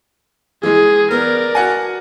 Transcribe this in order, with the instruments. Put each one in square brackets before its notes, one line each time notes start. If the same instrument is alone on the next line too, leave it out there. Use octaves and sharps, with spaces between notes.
[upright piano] E3 G#3 [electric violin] G#4
[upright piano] B3 [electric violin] A#4 D5
[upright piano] F#4 F#5 G#5